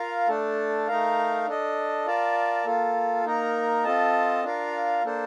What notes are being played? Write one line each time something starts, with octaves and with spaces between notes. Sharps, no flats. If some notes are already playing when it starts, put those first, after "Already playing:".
Already playing: F4 A#4 F5
A3 D4 A4
A3 D#4 A#4 F5
D4 A4 D#5
F4 A#4 D5 A5
A#3 F4 A4
A#3 D#4 A#4
C4 F4 A4 D#5 A5
D4 F4 A#4 F5
A#3 D4 A4 C5